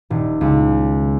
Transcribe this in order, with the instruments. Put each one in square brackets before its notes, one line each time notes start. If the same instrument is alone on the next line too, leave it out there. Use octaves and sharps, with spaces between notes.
[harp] D#1
C#2